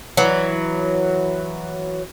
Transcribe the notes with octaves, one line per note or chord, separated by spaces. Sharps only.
E3 F#3